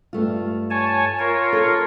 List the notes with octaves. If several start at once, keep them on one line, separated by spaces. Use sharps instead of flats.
G2 A3 F4
C#5 G#5 A5
F4 A#4 C#5
A4